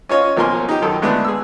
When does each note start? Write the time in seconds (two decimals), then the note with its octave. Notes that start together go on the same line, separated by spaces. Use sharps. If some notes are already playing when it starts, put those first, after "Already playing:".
0.09 C#4 F4 C#5 D#5
0.37 B1 F3 A#3 A#4 G#5 C6
0.69 D#4 G4
0.82 F#2 D#3 A4
1.02 D3 G#3 A3 B3 D4
1.24 G#4 E6